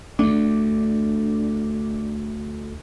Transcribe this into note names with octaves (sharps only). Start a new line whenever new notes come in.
D2 A3 D4